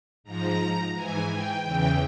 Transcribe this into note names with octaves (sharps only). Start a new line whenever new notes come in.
G#2 F3 A#5
G#2 E3 G#5
G5
E2 C#3 E3 G5